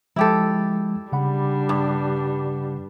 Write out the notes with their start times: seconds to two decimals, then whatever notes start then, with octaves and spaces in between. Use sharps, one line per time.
0.16 F3 G#3 E4 G4 A4
1.12 C#3 G3 D4 F#5 B5
1.69 G2